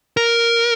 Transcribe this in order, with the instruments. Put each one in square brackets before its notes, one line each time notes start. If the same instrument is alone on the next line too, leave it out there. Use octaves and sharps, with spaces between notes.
[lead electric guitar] A#4